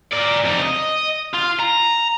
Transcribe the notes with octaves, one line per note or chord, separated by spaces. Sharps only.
A#4 D5
F2 D#4
D#5
F4
A#5